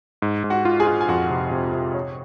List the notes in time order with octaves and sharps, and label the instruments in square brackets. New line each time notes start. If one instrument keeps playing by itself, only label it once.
[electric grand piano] G#2
G#2
[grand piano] F#4 F#5
[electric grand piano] F4
[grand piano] G#4 G#5
[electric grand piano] F4
[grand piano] G#5
[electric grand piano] F2 [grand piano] F#4 F#5
[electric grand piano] C3
C3
C3
C#5